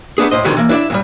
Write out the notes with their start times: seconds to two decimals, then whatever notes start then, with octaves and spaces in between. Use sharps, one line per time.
0.18 A3 B3 D4 G#4
0.31 A2 C5 D#5
0.44 B2 D3 D#3 F3 G3 G#3
0.57 E3 A#3
0.69 D4 E4 C#5 D5 E5
0.90 E2 G#2 G3